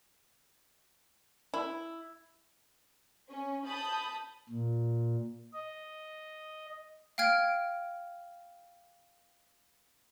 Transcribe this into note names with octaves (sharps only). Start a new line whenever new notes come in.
E4
C#4
A5 B5 D#6 G6
A#2
D#5
F5 G5 F6 G#6 D7